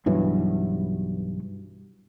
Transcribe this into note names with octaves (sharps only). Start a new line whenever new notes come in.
B1 G2 E3 F#3